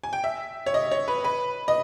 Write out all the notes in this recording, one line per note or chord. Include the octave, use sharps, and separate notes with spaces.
G#5
G5
E5
C#5
D#5
C#5
B4
B4
D#5